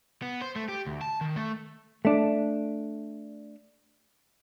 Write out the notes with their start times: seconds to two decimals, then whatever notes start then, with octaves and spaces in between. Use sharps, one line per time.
0.22 B3
0.41 C5
0.56 A3
0.68 G4
0.87 D2
1.01 A5
1.21 D#3
1.36 A3
2.05 A3 D4